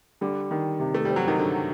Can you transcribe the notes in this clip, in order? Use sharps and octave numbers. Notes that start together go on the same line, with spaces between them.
D3 G3
D#3
C3
A3
G3 C4
F#3
D#3
D3 F#3